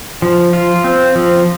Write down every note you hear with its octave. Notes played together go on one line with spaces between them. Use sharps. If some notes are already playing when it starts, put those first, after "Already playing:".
F3
F4
C4
F3